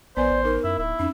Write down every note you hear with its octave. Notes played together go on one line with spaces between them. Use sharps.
A#1 B3 B4 C5 D5 G#5
A1
D#4 A#4
F#2 E4
D1 E4
F2 C#4 D#4